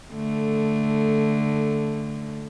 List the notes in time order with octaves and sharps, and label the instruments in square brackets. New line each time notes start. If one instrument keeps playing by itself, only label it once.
[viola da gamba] D3 A3